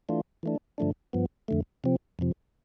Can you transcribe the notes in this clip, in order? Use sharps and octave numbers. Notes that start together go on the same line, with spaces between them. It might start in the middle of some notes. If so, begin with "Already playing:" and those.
E3 A3 D4 F4
E3 A3 D4
G2 D3 F3 A3 D4
G2 F3 B3
F2 D3 A3
C3 F3 C4
F2 C3 F3